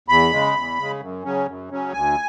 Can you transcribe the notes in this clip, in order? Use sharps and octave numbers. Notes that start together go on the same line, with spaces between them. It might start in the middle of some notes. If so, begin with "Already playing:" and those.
E2 B5
C#3 G#3
E2
C#3 G#3
F#2
C#3 F#3 C#4
F#2
C#3 F#3 C#4
D2 G#5